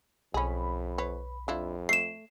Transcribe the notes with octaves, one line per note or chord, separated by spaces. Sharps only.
B1 F2 C#4 G#4 B5
B4 C#5
F2 D4 E4 F4
A3 C7 E7